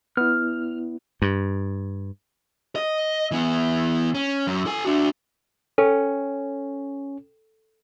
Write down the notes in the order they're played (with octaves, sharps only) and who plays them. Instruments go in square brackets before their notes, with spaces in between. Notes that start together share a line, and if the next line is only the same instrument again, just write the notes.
[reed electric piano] B3 E4 [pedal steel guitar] F6
[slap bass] G2
[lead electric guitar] D#5
E3 B3
C#4
F#2
A4 G#5
D4 F#4
[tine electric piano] C#4 [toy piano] A4 G5